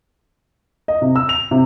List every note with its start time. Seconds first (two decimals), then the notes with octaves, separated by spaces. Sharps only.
0.88 D#5
1.02 C3
1.16 E6
1.29 F7
1.51 C3